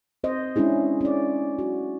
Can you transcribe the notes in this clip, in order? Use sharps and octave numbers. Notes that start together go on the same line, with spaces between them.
C4 C5 D#5
G#3 C#4 D4 E4 G#4
C#4 D5
F#4